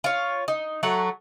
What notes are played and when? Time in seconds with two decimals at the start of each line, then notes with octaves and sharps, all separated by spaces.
0.04 F4 C#5
0.48 D#4
0.83 F#3 A3 F#5